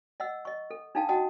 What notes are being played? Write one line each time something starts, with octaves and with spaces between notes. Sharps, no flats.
D#5 F#5 E6
D#5 C#6
A4
D4 D#4 A4 F5 G5 A5
F#4 D#5 F#5 G5 A5 D#6